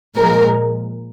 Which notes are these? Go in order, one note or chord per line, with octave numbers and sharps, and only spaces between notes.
A#2 F3 G#3 A#4